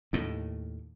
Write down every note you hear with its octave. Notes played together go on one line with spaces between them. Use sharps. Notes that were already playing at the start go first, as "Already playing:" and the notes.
D#2 A2